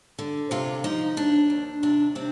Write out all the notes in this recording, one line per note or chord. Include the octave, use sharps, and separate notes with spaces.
D3
C3 F4
F3 D#4
D#2 D4
D#2
C3 D4
C3 C4